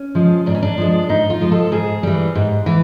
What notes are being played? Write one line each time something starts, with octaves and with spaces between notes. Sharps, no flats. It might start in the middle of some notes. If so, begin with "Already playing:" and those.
Already playing: C#4
F3 G#3
G#2 D4
C#4
D4
F3 G#3
G#2 D#4
F4
F3 G#3
A4
G#2 G#4
E3 G3
G#2
E3